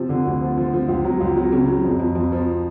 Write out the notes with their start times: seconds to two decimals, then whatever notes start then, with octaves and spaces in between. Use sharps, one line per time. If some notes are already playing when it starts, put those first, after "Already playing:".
Already playing: C3 F3
0.09 D3
0.26 D2
0.41 F3
0.58 F3
0.73 F3
0.89 C#2
1.05 F#3
1.21 C#2
1.37 F#3
1.52 C#3
1.68 F#3
1.85 F2
2.00 F2
2.15 F2
2.32 F3